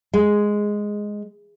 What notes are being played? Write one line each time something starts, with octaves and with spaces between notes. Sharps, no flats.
G#3